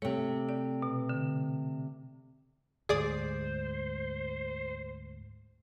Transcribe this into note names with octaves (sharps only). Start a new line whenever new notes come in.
C3 A3 C#5
D5
B2
D3
D2 G#2 G#4 C5 D5 D#6